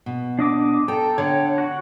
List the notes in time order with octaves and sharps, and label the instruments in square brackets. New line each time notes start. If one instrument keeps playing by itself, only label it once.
[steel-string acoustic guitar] B2
[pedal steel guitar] D4 D#5 D6
[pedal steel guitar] A4 [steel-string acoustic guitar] G5 A#5
[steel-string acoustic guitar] D3 [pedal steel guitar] C#5 G5
[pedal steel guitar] F#4